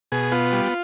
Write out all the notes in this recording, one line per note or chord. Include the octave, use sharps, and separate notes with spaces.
B2 G#4
B3 F4
G3